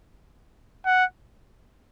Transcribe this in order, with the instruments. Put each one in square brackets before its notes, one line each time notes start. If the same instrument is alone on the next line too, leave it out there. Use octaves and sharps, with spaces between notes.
[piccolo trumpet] F#5